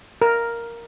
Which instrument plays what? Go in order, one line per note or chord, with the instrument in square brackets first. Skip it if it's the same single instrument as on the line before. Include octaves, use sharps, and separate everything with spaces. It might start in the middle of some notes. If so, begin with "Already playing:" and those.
[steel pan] A#4